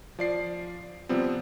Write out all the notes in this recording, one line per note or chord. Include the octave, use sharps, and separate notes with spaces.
F3 D5 C7
C3 F3 G3 B3 C4